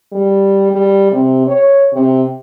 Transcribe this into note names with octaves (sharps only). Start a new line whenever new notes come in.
G3
G3
C3
C#5
C3